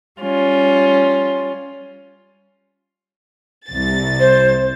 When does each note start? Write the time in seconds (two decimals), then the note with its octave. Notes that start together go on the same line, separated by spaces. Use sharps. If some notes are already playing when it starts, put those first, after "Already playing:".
0.21 G3 C#4 F4
3.69 C2 A6
4.20 C5